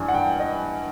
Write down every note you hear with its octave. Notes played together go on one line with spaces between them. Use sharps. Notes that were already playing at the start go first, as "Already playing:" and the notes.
Already playing: G2 E3 G3 G#5
F#5
G5
D#5